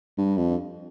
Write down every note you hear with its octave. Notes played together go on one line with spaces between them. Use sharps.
G2
F2